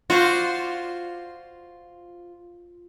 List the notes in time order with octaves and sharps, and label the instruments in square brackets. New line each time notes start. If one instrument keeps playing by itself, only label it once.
[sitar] F4 [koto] F#4 C5 D5